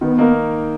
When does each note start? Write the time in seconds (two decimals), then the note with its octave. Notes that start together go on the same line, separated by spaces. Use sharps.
0.01 D#3 B3
0.18 A#3 D#4 A#4